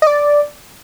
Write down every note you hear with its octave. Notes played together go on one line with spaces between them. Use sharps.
D#5
D5